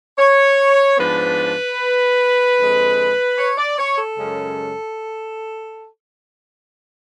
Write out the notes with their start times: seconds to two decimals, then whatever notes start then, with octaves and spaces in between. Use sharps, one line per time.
0.18 C#5
0.98 G#2 F3 B3 D4 B4
2.58 F2 D3 G#3
3.38 C#5
3.58 D5
3.78 C#5
3.98 A4
4.18 F#2 C#3 G#3 C#4